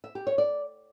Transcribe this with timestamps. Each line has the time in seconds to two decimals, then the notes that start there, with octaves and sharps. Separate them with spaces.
0.04 E5
0.15 G4
0.27 C#5
0.38 D5